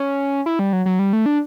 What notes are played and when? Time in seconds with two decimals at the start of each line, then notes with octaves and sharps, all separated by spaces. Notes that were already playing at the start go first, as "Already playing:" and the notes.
Already playing: C#4
0.46 E4
0.59 G3
0.73 F#3
0.86 F#3
0.99 G3
1.13 A3
1.26 D4